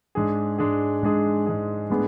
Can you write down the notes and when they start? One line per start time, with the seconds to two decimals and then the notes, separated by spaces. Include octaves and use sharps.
0.15 G#2 G#3 D4 G#4
0.58 G#2 G#3 D4 G#4
1.03 G#2 G#3 D4 G#4
1.46 G#2 G#3 D4 G#4
1.90 A2 G#3 B3 D4 G#4